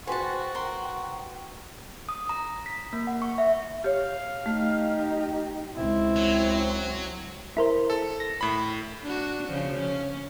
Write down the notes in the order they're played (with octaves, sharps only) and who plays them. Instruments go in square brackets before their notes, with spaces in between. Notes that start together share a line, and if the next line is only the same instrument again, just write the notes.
[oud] F#4 B4 C5 [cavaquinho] G#4 A5 [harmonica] F#5 C#6 [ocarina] G5
[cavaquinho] A#4 C6
[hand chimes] D#6
A#5
B6
A#3
F#5
C#6
E5
[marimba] G4 C#5 [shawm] F5
[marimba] A3 [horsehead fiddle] D#4 G4
[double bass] C#2 C4 [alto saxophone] E4
[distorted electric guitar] F#3
[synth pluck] E4 A#4 C5
[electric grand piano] A4
[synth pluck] A#6
[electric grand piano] A2 B5
[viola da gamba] D4 F#4
C#3 F3
C#4